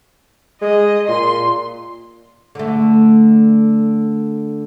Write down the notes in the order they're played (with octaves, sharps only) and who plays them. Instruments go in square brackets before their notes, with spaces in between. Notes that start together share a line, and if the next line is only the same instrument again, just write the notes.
[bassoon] G#3 [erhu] D#5
[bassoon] A#2 [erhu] C6
[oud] D3 A3